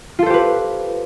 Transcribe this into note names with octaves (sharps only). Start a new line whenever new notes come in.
F4 G4 A4 B4 C5